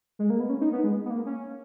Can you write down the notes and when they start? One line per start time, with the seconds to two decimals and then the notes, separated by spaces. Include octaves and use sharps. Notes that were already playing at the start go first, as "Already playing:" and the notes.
0.19 G#3
0.30 A#3
0.40 B3
0.50 C#4
0.61 D#4
0.72 B3
0.84 G#3
1.05 B3
1.10 A#3
1.26 C#4